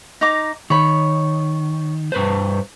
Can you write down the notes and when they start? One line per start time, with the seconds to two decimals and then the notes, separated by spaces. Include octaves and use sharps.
0.21 D#4 A#5 D6
0.70 D#3 C#5 B5
2.12 G2 B4 C5